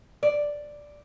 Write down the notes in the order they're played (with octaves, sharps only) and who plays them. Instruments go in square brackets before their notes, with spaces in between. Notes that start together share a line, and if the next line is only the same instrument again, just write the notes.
[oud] D5